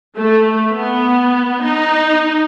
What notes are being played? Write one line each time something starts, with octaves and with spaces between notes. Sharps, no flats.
A3
B3
D#4